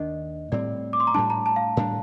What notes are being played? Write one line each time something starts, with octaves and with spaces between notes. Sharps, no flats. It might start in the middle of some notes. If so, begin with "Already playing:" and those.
Already playing: D#2 D#3 D4 D#5
A2 G3 C4 D5
D6
C6
A#5
A2 G3 D4 A5
A#5
A5
F5
A2 G3 D4